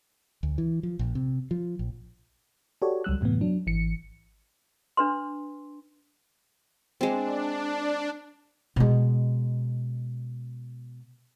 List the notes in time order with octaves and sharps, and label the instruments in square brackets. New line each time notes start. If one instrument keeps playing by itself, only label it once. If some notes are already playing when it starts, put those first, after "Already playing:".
[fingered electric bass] D2
E3
F3
A#1
C3
F3
A#1
[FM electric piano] F#4 G4 A4 C#5 D5
C#2 F#3 G3 E6 F#6
F#2 A2 C3 E3 B3
F#3 D4
G#1 E3 C#7
[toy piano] D4 B4 C6
[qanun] G#3 C4 [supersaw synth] D4
[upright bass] B2 G#3